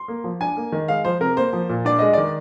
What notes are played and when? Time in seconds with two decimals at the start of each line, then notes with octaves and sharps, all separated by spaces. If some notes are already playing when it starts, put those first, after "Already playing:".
Already playing: C6
0.08 A#3
0.24 F3
0.41 D4 G#5
0.57 A#3
0.72 D#3
0.88 G#3 F5
1.05 F3 C5
1.21 C3 A#4
1.37 A#3 C5
1.53 F3
1.69 A#2
1.85 D4 D5
1.99 G#3 D#5
2.13 D#3 D5